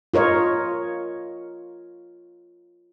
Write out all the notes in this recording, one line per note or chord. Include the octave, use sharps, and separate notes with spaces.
F4 A#4 C#5 D#5